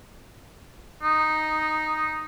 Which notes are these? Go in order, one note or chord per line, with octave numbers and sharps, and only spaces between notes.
D#4